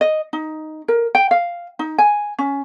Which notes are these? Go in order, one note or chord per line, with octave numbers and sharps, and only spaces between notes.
D#5
D#4
A#4
G5
F5
D#4
G#5
C#4